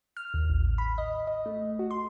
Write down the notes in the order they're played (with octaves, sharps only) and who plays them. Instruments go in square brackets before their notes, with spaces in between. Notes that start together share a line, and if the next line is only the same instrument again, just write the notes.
[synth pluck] F6
D#2
A1
B5
D#5
D#5
A3
F#4
C6